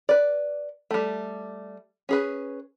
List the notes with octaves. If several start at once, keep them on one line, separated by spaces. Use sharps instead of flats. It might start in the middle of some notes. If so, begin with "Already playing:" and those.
B4 D5
G3 A3
C#4 G#4 B4